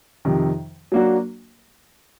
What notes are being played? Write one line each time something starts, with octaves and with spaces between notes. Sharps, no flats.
F2 C3 D#3
F#3 A#3 D4 F#4